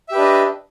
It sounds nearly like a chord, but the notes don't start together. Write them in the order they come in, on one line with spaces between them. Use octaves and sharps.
E5 G4 B4 D4 D#5